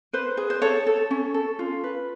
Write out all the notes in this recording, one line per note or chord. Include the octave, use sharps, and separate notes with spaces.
B4 C5
G#4
C5
A4 C#5
A4
C#4
A4
F4
B4